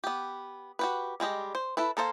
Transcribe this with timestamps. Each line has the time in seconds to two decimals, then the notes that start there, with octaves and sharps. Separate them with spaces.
0.04 B3 G4
0.79 F#4 G4 B4
1.20 G3 G#3 G4 D#5
1.55 C5
1.77 E4 A4 B4
1.97 A#3 A4 C5 F5